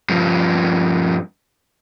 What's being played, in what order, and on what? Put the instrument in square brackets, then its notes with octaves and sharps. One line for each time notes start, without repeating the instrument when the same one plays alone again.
[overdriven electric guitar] G2 F3